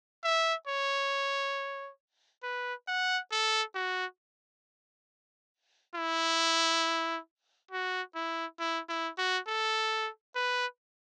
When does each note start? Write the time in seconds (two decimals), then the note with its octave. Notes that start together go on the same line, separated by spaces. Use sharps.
0.24 E5
0.68 C#5
2.43 B4
2.88 F#5
3.32 A4
3.75 F#4
5.95 E4
7.71 F#4
8.15 E4
8.60 E4
8.89 E4
9.18 F#4
9.48 A4
10.35 B4